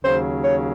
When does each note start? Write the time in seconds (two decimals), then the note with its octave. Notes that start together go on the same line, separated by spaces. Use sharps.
0.04 D#2 C#3 F#3 C5
0.43 C#5